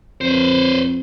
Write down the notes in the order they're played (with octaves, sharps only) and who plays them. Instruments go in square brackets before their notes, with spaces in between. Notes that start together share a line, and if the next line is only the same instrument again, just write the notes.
[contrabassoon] F2 [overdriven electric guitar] B4 C5